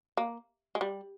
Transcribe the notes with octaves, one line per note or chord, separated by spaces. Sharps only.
A#3
G#3
G3